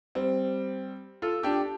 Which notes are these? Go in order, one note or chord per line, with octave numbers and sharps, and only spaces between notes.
G3 C4
F4 A4
D4 G4